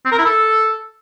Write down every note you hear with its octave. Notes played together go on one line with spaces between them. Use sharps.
C4
A#4
E4
A4